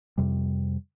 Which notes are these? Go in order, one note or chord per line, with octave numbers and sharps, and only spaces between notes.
F2 C3 G3